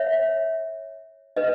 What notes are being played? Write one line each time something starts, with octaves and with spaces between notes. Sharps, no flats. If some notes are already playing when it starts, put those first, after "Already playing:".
Already playing: C#5 E5
B4 D#5